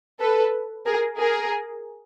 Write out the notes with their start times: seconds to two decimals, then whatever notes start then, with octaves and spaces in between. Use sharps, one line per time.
0.20 A4 B4
0.86 G#4 A#4
1.18 G#4 A#4